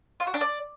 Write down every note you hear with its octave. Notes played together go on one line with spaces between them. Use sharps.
F4
F#4
D4
D5